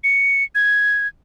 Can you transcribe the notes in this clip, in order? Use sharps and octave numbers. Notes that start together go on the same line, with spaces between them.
C#7
G#6